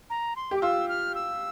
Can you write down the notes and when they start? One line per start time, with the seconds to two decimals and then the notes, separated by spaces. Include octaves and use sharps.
0.10 A#5
0.36 C6
0.51 G4 D6
0.62 F4 E6
0.89 F6
1.15 E6